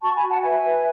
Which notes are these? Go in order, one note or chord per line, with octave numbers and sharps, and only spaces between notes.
F#4 A5 C#6
G#5 B5
F#4
F#5 A5
B4 E5 G#5
B4